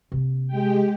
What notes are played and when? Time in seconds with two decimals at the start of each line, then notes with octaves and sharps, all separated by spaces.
0.12 C3 A#3
0.47 G#3 G4 G5